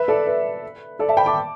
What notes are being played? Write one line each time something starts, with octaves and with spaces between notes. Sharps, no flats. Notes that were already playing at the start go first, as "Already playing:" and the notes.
Already playing: B4 E5
A4 D5
B4
A4 D5
E5 A5
G5 B5
A5 D6